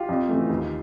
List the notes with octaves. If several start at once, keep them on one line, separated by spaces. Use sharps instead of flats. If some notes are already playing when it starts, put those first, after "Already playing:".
Already playing: F4 G4
F2
C#3 E3 A3
D#2